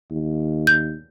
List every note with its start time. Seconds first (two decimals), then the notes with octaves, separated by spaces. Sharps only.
0.11 D#2
0.67 G6